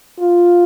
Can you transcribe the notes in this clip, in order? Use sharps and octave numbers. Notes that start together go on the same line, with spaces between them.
F4